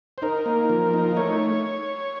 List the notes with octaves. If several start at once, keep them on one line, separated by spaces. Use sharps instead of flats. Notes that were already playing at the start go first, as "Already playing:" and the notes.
C5
D#4 A#4
A#3
F3
D#4
A3 C#5